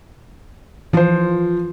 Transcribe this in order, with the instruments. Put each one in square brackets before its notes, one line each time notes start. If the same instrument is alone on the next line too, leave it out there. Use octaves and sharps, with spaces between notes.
[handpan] E3 F4 [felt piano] F3 C5